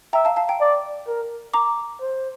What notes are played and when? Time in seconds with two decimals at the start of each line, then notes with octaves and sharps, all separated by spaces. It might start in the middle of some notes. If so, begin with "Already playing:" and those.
0.13 E5 G5 A#5
0.25 F5 A5
0.36 F5 A5
0.48 G5 A#5
0.60 D5
1.07 A#4
1.54 A#5 D6
2.01 C5